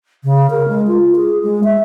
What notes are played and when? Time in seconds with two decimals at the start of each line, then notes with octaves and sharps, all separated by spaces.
0.24 C#3
0.50 A#4
0.68 G#3
0.87 F4
1.16 G#4
1.43 G#3
1.64 E5